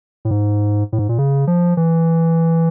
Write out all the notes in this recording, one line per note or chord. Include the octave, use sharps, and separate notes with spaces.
A2
G#2
A2
G#2
A#2
C#3
F3
E3